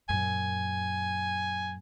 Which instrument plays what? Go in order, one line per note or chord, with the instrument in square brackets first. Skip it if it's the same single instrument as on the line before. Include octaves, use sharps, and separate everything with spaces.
[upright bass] F#2 A#2 [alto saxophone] G#5